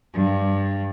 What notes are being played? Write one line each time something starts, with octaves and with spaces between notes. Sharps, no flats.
G2